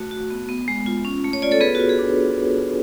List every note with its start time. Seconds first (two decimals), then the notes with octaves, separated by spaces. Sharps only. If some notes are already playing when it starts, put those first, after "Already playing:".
Already playing: A3 F#4
0.11 F#4
0.30 B3
0.49 B3
0.68 G#3
0.86 F4
1.05 C#4
1.24 A3
1.33 C#5
1.42 F4 D5
1.51 A4 C#5
1.61 B3 G#4 B4
1.75 F#4
1.80 F4
1.89 G#4
1.99 D4